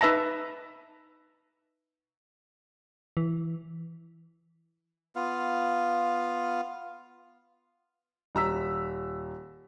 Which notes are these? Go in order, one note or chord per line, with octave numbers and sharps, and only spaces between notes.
D#4 B4 E5 A5 A#5
E3
B3 F4 F5
D#1 A#5 E6 B6